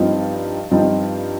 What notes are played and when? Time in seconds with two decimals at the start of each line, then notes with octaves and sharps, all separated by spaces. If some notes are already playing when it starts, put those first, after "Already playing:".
Already playing: G2 F3 C4 D#4
0.71 G2 F3 C4 D#4